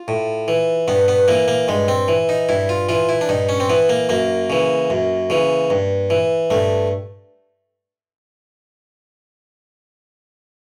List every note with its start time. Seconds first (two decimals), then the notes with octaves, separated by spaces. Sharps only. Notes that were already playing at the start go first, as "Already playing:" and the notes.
Already playing: F4
0.08 A2
0.48 E3
0.88 G2 B3
1.08 B3
1.28 E3 A#3
1.48 A#3
1.68 G2 G#3
1.88 C4
2.08 E3
2.29 D#4
2.49 G2 E4
2.69 F4
2.89 E3 F4
3.09 E4
3.21 D4
3.29 G2 D#4
3.49 C#4
3.60 C4
3.69 E3 B3
3.89 A#3
4.09 F#2 A#3
4.50 C#3 E3
4.90 F#2
5.30 C#3 E3
5.70 G2
6.10 E3
6.50 G2 A3